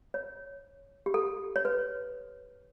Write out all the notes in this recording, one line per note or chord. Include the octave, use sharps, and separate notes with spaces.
C#5
G4
A4
C#5
B4